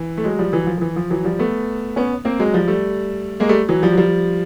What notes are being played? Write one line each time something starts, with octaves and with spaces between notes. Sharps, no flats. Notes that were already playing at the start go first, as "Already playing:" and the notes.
Already playing: E3
A3
F#3 G#3
F3 G3
E3 F#3
F3
F3
E3
F3
E3 F#3
F3 G3
A3 B3
B3 C#4
A#3 C4
F#3 G#3
F3 G3
G3 A3
G#3 A#3
G3 A3
E3 F#3
F3 G3
F#3
F3 G3